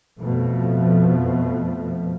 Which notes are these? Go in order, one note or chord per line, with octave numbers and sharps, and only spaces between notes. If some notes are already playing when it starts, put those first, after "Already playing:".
F2 B2 F3 A3